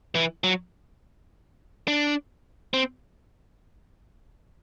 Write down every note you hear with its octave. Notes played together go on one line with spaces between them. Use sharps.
E3
F#3
D4
C4